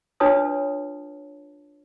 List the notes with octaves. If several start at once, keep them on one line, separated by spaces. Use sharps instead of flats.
D4 F4 B4 C#5 A5 D#6